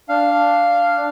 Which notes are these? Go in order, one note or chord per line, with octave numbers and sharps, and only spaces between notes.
D4 F5